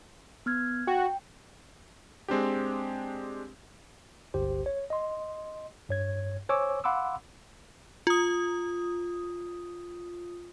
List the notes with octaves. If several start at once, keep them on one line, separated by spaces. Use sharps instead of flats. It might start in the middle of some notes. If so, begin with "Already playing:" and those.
B3 F6 G#6
F#4 G5
G#3 C4 D4 G4
G1 C#2 G4 C5
C#5
D#5 C6
G2 C#5 G#6
C5 C#5 G#5 C#6 D6 E6
F5 F#5 B5 C6 D6 E6
F4 D#6